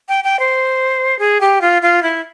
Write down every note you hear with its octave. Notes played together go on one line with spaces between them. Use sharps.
G5
G5
C5
G#4
G4
F4
F4
E4